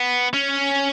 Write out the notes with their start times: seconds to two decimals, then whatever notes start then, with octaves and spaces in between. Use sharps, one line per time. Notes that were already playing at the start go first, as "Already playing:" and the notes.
Already playing: B3
0.34 C#4